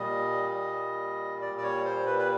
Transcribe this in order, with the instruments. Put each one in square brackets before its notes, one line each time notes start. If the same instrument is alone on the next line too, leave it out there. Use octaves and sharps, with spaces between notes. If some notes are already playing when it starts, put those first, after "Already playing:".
Already playing: [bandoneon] A#2 G3 D#5
D#5
D5
D5
C#5
C5
B4
B4